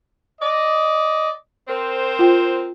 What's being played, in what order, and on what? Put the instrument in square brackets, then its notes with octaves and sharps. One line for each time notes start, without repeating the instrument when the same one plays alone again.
[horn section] D5 D#5
C4 A#4 C5
[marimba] F4 G5